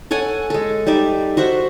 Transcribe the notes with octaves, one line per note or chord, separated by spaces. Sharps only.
A4 C#5 F#5 G#5
G#3 A4
G3 D#4 D5 E5
F#4 C5 E5 F#5